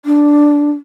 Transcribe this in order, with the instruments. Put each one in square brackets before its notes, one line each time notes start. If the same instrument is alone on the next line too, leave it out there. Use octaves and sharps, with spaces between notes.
[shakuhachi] D4